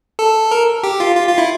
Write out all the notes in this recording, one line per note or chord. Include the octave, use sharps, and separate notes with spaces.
A4
A#4
G4
F4
F4
F4
E4